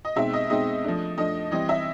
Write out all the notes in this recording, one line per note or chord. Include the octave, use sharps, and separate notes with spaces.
D#5
B2 G#3 C4 D#4 E5
D#5
B2 G#3 C4 D#4 D#5
F3 A3 D4
F3 A3 D4 D#5
E3 G3 C4 D#5
E5